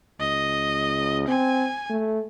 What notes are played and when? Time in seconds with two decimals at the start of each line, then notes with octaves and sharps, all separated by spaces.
0.20 C#2 D#5
1.28 C4 G#5
1.90 A3